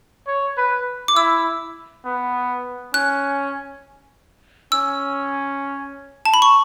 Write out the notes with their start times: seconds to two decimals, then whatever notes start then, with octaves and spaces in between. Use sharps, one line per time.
0.27 C#5
0.57 B4
1.08 D6
1.16 E4 E6
2.05 B3
2.94 C#4 F#6
4.72 C#4 E6
6.25 A5
6.34 B5
6.42 C#6